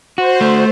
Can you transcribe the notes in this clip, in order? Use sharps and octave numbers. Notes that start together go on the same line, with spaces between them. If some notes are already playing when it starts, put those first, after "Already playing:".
F#4 C5
A3